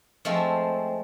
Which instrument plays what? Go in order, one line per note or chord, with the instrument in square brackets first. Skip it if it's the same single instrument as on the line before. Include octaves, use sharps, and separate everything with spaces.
[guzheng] F3 G#3 A3 C4